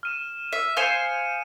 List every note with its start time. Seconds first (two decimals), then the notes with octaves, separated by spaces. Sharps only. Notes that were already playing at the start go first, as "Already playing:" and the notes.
0.03 F6 D#7 E7
0.53 E5
0.77 C5 F5 G#5 D#6 C#7 D#7